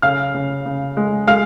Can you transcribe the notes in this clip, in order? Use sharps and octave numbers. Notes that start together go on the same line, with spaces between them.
C#3 F5 F6
C#3
C#3
G#3
G#3 F5 F6